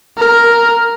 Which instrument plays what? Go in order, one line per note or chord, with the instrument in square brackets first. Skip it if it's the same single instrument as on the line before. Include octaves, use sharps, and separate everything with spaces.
[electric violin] A#4